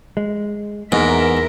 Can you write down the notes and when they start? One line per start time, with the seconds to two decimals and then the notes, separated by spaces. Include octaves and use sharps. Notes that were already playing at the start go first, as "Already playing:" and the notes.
0.17 G#3
0.92 E2 G#2 E3 A#3 B3 A#4 E5